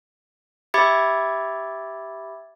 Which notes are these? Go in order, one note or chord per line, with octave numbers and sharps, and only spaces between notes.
G4 E5 B5 D6 G#6 A6